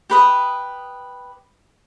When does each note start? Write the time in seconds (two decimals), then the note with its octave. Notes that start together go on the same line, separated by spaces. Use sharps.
0.10 G4 B4 D#6